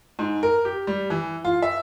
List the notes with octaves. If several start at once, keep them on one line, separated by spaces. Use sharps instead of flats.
G#2
A#4
G4
G3
E3
F4
E5